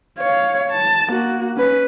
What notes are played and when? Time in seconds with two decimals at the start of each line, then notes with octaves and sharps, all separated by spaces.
0.19 C#5 F5
0.72 A5
1.11 A#3 F#4
1.56 C#4 B4